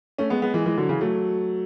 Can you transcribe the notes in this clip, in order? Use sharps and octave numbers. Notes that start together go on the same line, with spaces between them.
A3 C#4
G#3 B3
G#3 B3
E3 G#3
E3 G#3
D3 F#3
C#3 E3
F#3 A3